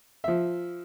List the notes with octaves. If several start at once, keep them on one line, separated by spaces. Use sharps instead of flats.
F3 E5